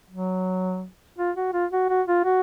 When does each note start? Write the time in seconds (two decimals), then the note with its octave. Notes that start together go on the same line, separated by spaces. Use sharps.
0.10 F#3
1.18 F4
1.36 F#4
1.53 F4
1.72 F#4
1.89 F#4
2.08 F4
2.25 F#4